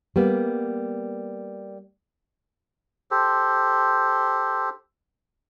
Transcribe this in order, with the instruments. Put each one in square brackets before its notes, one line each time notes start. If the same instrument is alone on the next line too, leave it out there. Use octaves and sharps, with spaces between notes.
[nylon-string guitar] G3 A#3 B3
[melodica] G4 A4 C5